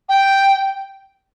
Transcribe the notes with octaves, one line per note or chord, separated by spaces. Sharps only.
G5